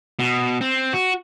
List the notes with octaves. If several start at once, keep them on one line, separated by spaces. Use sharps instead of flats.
B2
C4
F#4